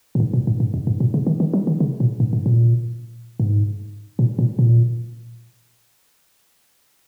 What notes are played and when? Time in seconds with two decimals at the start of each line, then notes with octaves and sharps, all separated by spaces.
0.15 A#2
0.20 G#2
0.34 A#2
0.47 G#2
0.60 G#2
0.74 F#2
0.87 G#2
1.00 A#2
1.14 C#3
1.27 D#3
1.40 D#3
1.54 F#3
1.67 D#3
1.80 C#3
2.00 A#2
2.20 G#2
2.33 G#2
2.46 A#2
3.40 G#2
4.19 A#2
4.39 A#2
4.59 A#2